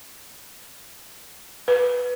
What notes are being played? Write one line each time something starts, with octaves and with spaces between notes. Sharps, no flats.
B4